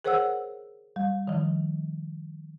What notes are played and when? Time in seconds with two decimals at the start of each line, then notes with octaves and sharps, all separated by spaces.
0.05 G#4 A#4 C5 C#5 F#5 E6
0.96 G3
1.27 D#3 F3